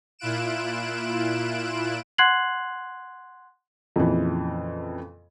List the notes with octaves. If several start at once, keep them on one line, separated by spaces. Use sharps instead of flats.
A#2 E4 F4 F#6 D7 E7
F#5 C6 F#6 G#6 C7 F#7
F2 A#2 C#3 E3